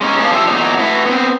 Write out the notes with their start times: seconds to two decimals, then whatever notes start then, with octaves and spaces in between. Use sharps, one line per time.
0.01 G#3 C#4 D#4
0.19 B3 C#4 D4 C#5 F5 A5
0.31 F3 G3 D4 C5 E5
0.47 E2 A#2 F#3 D#4
0.79 A3 E4 F#4 B4
1.06 B3 C4